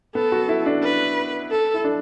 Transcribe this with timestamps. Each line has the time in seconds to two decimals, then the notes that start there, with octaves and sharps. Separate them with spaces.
0.15 B3 A4
0.32 F#4
0.49 E4
0.66 D4
0.83 B4
1.51 A4
1.74 E4
1.84 D4